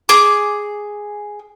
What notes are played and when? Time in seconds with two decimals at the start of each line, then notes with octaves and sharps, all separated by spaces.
0.09 G#4 D6